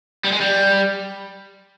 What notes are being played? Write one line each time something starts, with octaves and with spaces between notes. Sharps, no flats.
G3
G#3
G3